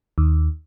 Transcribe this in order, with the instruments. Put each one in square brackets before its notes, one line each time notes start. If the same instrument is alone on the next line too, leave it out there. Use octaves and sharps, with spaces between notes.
[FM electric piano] D#2